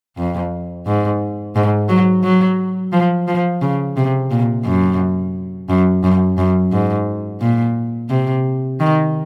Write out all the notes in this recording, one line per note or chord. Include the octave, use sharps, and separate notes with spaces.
F2
G#2
G#2
F#3
F#3
F3
F3
C#3
C3
A#2
F#2
F#2
F#2
F#2
G#2
A#2
C3
D#3